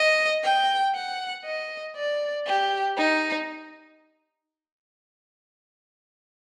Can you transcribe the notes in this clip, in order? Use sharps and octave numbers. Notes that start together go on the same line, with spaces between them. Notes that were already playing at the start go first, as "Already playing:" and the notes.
Already playing: D#5
G5
F#5
D#5
D5
G4
D#4